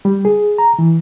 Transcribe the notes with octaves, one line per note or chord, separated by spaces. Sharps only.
G3
G#4
A#5
E3